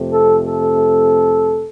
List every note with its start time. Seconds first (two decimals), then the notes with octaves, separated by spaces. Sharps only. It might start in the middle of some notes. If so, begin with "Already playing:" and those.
Already playing: F2 C3 A3
0.13 A4
0.48 A4